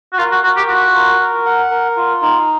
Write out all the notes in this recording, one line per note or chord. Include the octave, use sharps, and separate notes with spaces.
F#4
F4 A#4
F#4
F#4 A#4
G4
F4 F#4
A#4
A#4
F#5
A#4
F4
D#4